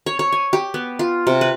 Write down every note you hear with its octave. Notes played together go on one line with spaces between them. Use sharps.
C#5
C#5
G#5
G4
B3
F4
C3
B4